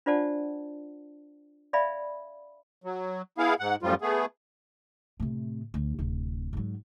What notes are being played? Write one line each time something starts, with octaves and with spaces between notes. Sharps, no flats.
D4 F4 C5 D5 F#5 A5
D5 E5 F5 G#5 B5
F#3
B3 E4 G#4 F5
G#2 F#5
F#2 A2 F3 G3 F4
A3 B3 G#4
A2 C3
D2
D1 C3
G#2 F#3